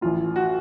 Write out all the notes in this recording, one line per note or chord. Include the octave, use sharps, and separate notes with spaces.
A1 A2 F4
F#4